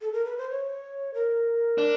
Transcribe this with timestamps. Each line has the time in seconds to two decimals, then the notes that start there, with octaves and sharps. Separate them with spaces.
0.00 A4
0.13 A#4
0.25 B4
0.38 C5
0.50 C#5
1.14 A#4
1.78 D4